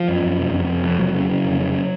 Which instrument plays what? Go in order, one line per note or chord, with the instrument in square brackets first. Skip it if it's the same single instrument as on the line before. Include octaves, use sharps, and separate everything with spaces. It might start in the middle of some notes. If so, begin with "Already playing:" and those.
Already playing: [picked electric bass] F3
F#2
F#2
F1
F2
F1
F2
F1 F#3
C#3
C#3
F1
C#3